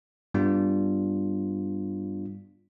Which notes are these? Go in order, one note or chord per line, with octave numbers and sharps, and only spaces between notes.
G2 G3 B3 D4 F4